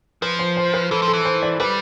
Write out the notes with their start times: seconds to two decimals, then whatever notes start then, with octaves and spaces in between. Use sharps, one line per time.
0.22 F3 B4
0.39 C5
0.57 C5
0.74 B4
0.91 E3 A4
1.02 F3
1.08 A4
1.13 E3
1.25 C5
1.42 D5
1.60 G3 B4